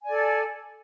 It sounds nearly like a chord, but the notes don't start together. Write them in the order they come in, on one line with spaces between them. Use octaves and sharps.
G#5 D5 A4